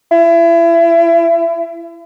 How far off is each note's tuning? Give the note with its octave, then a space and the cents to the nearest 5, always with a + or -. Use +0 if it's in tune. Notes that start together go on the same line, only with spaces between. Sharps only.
E4 +30